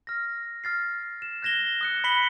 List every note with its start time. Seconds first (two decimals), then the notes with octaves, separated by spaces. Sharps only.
0.07 F6 A#6
0.64 F6 A6 C7
1.22 E7
1.42 F#6 G#6 A#6 E7 G7
1.81 D#6 F#6 C#7
2.04 B5 B6 C#7 F#7 G7